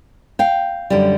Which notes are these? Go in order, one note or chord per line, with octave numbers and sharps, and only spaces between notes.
F5 G5
F#2 D3 G3